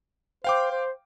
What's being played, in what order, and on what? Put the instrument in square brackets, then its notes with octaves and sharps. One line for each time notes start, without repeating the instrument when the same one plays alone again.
[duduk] C5 [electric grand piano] F5 G5 D6
[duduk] C5